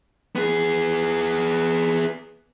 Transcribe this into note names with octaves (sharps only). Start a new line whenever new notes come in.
B3 G#4